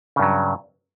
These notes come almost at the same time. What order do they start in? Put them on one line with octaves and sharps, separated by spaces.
C#3 G2 F#3